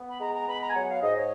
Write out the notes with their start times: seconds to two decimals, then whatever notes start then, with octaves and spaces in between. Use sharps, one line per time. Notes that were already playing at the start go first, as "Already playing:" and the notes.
Already playing: B3
0.09 B5
0.20 G#3 A#5
0.34 A#5
0.47 B3 B5
0.61 A#5
0.69 G#5
0.74 F#3 F#5
0.89 F5
1.02 G#2 D#5
1.16 C#5